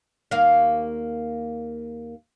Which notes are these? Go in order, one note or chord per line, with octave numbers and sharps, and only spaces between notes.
D#2 A#3 F5